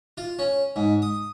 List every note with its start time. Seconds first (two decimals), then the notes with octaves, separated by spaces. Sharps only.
0.17 F4
0.39 C#4
0.76 G#2
1.02 D#6